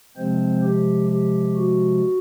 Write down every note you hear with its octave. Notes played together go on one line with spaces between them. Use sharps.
C3 F3 G#3 C4 C5
G4
G4
F#4